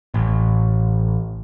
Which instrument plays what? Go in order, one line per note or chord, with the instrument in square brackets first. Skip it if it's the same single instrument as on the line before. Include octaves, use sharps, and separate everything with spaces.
[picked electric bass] A1